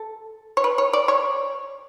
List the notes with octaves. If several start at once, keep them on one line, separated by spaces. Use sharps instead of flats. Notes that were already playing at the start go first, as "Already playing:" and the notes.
Already playing: A4
C#5
B4
C#5
D5
C#5